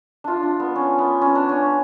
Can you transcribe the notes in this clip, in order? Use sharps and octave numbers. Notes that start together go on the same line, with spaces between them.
D4 F4
D4
B3
C#4
B3
C#4
D4
C#4